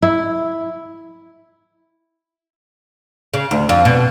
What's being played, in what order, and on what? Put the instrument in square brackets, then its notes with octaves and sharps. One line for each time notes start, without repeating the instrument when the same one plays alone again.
[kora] E4
[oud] C#3
D2
F2
B2